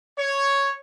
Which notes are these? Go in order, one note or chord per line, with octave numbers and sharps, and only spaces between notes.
C#5